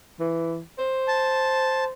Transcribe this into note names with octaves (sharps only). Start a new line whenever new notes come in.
E3
C5
A5